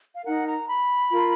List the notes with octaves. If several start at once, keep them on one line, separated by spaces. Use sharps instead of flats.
F5
D#4 A#4 F#5
A#5
B5
F4 A#4